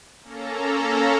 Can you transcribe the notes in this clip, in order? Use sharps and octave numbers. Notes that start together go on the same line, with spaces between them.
A#3 C#4 A4 A#5